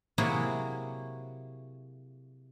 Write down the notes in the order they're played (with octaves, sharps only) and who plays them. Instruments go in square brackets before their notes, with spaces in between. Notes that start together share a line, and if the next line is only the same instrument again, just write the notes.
[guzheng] C3 F#3 A#3 E4 F#4 G#4